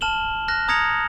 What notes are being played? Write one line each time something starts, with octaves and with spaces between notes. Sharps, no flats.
A5 F6 E7 F#7 G7
F6 F#6 A#6
A#5 D#6 G#6 A#6 C#7 F7